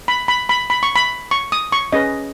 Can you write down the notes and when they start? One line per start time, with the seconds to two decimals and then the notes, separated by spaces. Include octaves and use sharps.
0.08 B5
0.28 B5
0.49 B5
0.70 B5
0.83 C#6
0.96 B5
1.31 C#6
1.52 D#6
1.72 C#6
1.92 C#4 G#4 B4 D#5